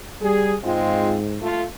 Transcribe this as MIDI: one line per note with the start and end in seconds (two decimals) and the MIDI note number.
0.22 0.57 55
0.22 0.54 68
0.64 1.49 44
0.64 1.16 56
0.64 1.16 60
0.64 1.16 65
1.42 1.63 57
1.42 1.63 65